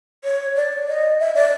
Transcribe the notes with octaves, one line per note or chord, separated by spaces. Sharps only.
C#5
D5
D#5
E5
D5